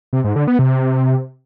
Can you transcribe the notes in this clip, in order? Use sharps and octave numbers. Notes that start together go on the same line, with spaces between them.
C3
G#2
D3
B3
C3